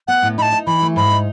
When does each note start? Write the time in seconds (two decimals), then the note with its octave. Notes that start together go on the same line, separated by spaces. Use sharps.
0.08 B3 F#5
0.22 A2
0.38 D#4 B5
0.42 A5
0.52 D#4
0.67 E3 B5
0.82 A3
0.96 G#2 B5
1.12 D#4